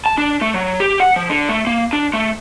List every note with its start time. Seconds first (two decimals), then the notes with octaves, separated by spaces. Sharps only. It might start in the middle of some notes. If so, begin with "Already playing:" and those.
0.06 A5
0.18 D4
0.41 A3
0.54 F#3
0.80 G4
1.00 F#5
1.16 F3
1.30 D3
1.49 A3
1.67 A#3
1.93 D4
2.13 A3